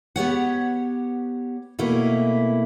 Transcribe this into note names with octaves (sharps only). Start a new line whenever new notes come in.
B3 G4 C#5 F#5
B2 A3 A#3 C#4 E4